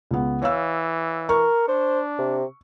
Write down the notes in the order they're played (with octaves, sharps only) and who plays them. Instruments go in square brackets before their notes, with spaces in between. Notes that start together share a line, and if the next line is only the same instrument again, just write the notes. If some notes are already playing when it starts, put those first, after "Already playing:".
[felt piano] C#2 B3
[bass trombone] E3 [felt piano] C#5 F5 E6
[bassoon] A#4 [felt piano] C#6
[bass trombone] D4 [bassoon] C5
[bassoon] C3